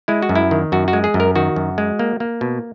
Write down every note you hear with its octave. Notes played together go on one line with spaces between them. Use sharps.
G#3 E4
F#4
F#2
E4
D#3
F#2 F#4
F#4
G#3
G#4
F#2
A#4
D#3 F#4
F#2
G#3
A#3
A#3
B2